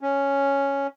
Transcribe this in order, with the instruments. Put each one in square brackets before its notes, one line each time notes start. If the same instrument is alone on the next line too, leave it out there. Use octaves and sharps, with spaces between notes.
[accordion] C#4